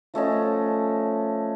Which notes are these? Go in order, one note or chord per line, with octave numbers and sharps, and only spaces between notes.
F3 A3 C#4 D#5